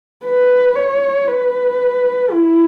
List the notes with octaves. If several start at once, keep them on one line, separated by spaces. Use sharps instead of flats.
B4
C#5
B4
E4